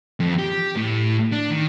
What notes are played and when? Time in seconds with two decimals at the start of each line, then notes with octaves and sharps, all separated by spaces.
0.20 F2
0.39 G4
0.76 A2
1.32 D4
1.51 D#3